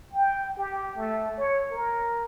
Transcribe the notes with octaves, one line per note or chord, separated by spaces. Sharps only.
G5
G4
A3
C#5
A#4